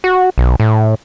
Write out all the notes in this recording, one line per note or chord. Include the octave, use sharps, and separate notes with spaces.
F#4
B1
A2